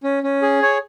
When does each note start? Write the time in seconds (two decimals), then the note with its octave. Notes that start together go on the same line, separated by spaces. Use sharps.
0.04 C#4
0.23 C#4
0.42 G#4
0.62 C#5